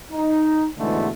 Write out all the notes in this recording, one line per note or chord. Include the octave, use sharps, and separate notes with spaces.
D#4
G#2 B2 D3 E3 G#3 A3